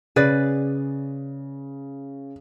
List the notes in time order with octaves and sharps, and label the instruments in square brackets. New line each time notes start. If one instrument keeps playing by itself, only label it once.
[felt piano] C#3 [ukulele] G#4 B4 D5